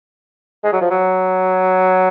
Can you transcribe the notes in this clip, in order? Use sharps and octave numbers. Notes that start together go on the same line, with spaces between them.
G#3
F#3
F3
F#3